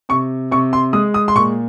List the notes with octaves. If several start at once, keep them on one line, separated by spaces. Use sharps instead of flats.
C3 C#6
C3 C#6
C6
G#3 D#6
D#6
C6
A#2 C#6